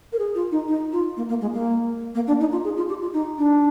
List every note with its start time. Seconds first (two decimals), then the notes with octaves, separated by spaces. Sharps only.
0.12 A#4
0.18 G#4
0.34 F4
0.51 D#4
0.67 D#4
0.92 F4
1.16 A#3
1.28 A#3
1.41 G#3
1.53 A#3
2.14 A#3
2.27 D4
2.39 D#4
2.51 F4
2.64 G#4
2.76 F4
2.88 G4
3.01 F4
3.13 D#4
3.37 D4